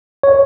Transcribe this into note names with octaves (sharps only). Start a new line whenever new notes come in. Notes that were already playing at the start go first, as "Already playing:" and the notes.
C#5